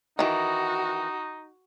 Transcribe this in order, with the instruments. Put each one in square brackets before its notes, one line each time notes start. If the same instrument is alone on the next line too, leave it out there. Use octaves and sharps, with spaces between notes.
[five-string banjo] D#3 E3 [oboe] D#4 [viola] F#4